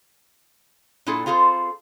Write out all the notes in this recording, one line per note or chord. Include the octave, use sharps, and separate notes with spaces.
A#2 D4 E4 G#4 A4
C4 F4 G#4 A4 C5